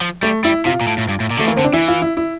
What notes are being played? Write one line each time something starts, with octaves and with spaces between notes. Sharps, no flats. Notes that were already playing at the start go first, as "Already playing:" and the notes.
F3
G3 A3
G3 E4
C3 F4
A#2
A2
A2
G2
A2
A#2
D3 A3
E3
A#3
D3 C4
D4
E3 E4
F4
E4
E4